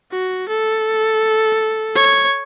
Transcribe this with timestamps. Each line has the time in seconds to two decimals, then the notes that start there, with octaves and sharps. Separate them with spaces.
0.11 F#4
0.49 A4
1.95 C#5